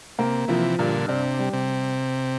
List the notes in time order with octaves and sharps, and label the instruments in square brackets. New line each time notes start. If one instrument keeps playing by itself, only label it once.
[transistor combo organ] C3 [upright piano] A#3
[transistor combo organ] C3 E3 [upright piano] F3
[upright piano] G2 [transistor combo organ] A#2 D3
[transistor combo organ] C3 [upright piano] D4
[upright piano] G3
[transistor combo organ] C3